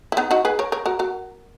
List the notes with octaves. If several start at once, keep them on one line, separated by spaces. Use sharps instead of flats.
E4
B3 D#4
D#4 F#4
G#4 B4
A#4 C#5
A#4 C#5
F#4 A#4
F#4 A#4